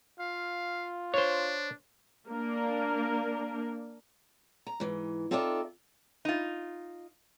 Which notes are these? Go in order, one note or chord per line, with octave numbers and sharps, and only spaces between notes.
F4 F5
D4 C5 C#5
A#3 D4 A#4
A#5
G#2 E3
C4 D#4 F4 A4 D5 E5
D#4 F4